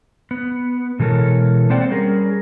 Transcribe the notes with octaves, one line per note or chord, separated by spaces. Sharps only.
B3
B2 E3 G#3 A4 A#4 C#5
A#3 C4 C5 D5 F#5 G5
G3 C#4 G#4 A#4